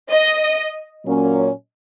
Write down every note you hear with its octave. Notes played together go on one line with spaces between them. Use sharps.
D#5
A#2 F#3 A#3 C#4